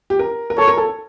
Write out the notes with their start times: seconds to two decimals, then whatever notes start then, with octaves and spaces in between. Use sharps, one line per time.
0.10 G4
0.19 A#4
0.50 A#4
0.58 A4 C#5
0.68 A#4
0.78 A4